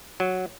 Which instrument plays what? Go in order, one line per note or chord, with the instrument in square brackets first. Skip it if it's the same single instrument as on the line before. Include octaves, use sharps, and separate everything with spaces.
[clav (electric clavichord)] F#3